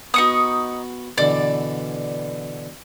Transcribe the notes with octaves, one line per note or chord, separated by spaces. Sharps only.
B3 D#4 F#4 C#6 D#6
B2 D3 E3 D5